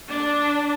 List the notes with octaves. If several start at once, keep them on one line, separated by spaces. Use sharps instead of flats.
D4